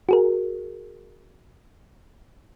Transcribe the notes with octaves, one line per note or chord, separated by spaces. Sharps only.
F#4 G#4 A#4